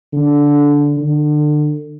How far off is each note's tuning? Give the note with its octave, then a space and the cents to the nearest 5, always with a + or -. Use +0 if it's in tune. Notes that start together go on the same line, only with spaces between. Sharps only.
D3 -15
D3 +30